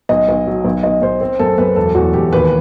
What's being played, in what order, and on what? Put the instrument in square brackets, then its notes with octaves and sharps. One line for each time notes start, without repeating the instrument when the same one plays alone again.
[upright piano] B1 D#5
B1
F#3
B1
B1 D#5
B1 C5
C4
F#2 A4
F#2 B4
E1 A4
E2 F#4
E1 G4
D#2 B4